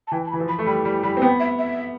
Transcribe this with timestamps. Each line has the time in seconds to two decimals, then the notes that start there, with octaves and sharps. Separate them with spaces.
0.07 A5
0.12 E3 G5
0.26 A5
0.31 B5
0.33 E3
0.40 F3
0.49 B5
0.59 A3
0.66 G3 B5
0.85 G3 B5
1.03 G3 B5
1.17 C4
1.22 B3 G5
1.40 E5
1.59 E5